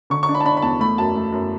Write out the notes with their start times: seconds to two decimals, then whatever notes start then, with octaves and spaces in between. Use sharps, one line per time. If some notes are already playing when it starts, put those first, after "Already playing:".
0.10 D3 C#6
0.23 C#6
0.29 D4
0.34 B5
0.40 A5
0.45 D4 B5
0.57 B5
0.62 E2 A5
0.80 A3 B5
0.98 F#2 A5
1.16 A3
1.32 F#2